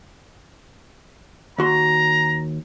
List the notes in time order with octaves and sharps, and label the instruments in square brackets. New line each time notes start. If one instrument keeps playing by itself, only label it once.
[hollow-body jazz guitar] D#2 F#4 C6 [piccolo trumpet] A#5